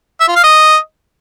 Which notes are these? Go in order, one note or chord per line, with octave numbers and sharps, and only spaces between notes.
E5
F4
F5
D#5